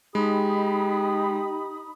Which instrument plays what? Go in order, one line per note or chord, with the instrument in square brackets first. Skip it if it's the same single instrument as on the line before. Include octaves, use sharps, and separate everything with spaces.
[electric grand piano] G#3 [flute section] D#4 B5 D#6 [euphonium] G4